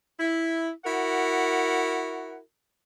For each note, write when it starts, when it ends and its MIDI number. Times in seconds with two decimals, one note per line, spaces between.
0.20 0.70 64
0.85 2.39 64
0.85 2.39 66
0.85 2.39 70
0.85 2.39 78